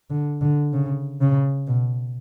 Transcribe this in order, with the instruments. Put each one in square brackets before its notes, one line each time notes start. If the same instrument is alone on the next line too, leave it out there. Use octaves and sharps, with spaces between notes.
[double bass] D3
D3
C#3
C#3
B2